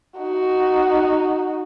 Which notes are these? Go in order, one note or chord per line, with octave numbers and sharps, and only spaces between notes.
D#4 F#4